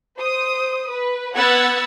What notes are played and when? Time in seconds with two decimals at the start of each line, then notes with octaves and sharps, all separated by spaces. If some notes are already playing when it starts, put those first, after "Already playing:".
0.18 C5 D#6
0.91 B4
1.35 B3 F#5 E6 F#6 G#6 A6